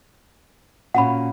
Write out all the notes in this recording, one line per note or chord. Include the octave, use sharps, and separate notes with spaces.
A#2 C#4 F#4 F#5 B5